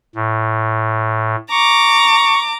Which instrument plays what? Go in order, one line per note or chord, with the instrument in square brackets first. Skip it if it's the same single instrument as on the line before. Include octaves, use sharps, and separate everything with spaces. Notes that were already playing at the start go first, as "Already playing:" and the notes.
[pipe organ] A2
[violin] A#5 D6 [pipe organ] C#6